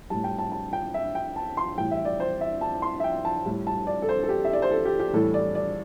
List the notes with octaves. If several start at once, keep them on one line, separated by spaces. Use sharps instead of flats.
A2 G3 A5
G5
A5
A5
G5
E5
G5
A5
C6
A2 E3 G3 G5
E5
D5
C5
E5
A5
C6
E5
G5
A5
A2 G3
A5
D5
A4
C5
A4
G4
E5
D5
C5
A4
G4
G4
A2 E3 G3 A4
D5
D5